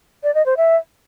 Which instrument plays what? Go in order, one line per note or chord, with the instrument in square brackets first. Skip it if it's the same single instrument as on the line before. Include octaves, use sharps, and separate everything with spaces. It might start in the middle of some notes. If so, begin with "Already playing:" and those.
[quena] D5
D#5
C5
E5